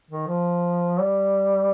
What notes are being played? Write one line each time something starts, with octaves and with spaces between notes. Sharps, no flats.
D#3
F3
G3